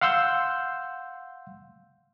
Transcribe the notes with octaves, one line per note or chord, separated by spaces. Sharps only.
F5 F#5 C6 E6 G6